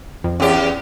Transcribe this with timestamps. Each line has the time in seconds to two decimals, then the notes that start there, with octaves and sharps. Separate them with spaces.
0.24 F2
0.40 E2 C#4 G4 G#4 D5